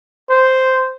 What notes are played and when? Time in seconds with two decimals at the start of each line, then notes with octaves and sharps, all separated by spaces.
0.29 C5